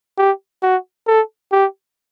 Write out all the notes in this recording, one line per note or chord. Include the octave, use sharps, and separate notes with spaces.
G4
F#4
A4
G4